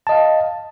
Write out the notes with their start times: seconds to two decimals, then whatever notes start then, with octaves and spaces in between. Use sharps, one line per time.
0.07 A5
0.09 D#5
0.12 F5